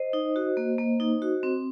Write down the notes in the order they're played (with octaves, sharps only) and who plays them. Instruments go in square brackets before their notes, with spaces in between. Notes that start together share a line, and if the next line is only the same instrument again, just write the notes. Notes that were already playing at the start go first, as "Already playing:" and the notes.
Already playing: [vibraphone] C5 D#5
D#4
F#4
A#3
A#3
D#4
F#4
C4